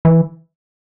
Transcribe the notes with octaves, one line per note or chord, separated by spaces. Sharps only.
E3